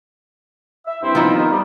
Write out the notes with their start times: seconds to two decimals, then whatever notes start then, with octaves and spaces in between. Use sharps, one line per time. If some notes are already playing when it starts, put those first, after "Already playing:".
0.87 E5
1.02 G2 C4 E4
1.15 F3 B3 D#4
1.35 D#3
1.50 G3